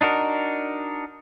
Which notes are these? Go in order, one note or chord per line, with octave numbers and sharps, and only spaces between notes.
D4 D#4 F#4 A#4